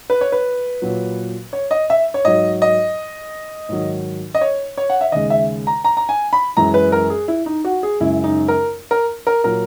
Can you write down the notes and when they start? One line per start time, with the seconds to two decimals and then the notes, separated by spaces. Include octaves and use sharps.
0.10 B4
0.21 C#5
0.32 B4
0.82 A#2 F#3
1.53 C#5
1.71 D#5
1.90 E5
2.14 C#5
2.25 G#2 F#3 D#5
2.62 D#5
3.69 G#2 D#3 F#3
4.35 D#5
4.41 C#5
4.77 C#5
4.90 F#5
5.01 E5
5.12 D#2 C#3 G#3 D#5
5.30 E5
5.67 A#5
5.84 A#5
5.97 A#5
6.09 G#5
6.33 B5
6.57 F#2 E3 G#3 A#5
6.74 B4
6.92 A#4
7.10 G#4
7.28 E4
7.46 D#4
7.65 F#4
7.83 G#4
8.00 F#2 C#3 G#3 E4
8.24 D#4
8.48 A#4
8.91 A#4
9.27 A#4
9.44 A#2 F#3 A#4